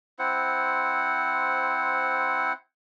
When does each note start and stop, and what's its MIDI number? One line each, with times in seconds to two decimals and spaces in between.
0.19 2.53 60
0.19 2.53 64
0.19 2.53 72
0.19 2.53 78